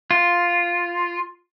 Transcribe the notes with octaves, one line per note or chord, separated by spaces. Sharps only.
F4